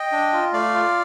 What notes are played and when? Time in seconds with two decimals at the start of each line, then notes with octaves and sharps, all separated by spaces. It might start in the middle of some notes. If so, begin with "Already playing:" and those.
Already playing: D#5 G5
0.12 D4
0.33 F4
0.53 A3 D5 F5
0.74 F4